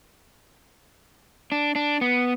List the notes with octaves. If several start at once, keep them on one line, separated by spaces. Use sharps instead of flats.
D4
D4
B3